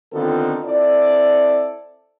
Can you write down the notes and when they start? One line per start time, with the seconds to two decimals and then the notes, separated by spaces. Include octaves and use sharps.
0.13 D3 D#3 B3 C4 F4 A4
0.65 C4 E4 A4 D5